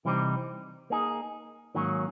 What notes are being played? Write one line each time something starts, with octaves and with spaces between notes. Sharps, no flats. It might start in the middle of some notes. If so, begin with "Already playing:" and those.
C3 E3 G3 C4 D#4
A#3 D#4 G#4
G#2 D#3 F#3 A#3 C#4